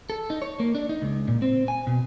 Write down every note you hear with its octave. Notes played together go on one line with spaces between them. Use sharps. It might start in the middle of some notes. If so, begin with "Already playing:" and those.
A4
D#4
C#5
A#3
D4
D#4
C#2
A#2
C4
G#5
B2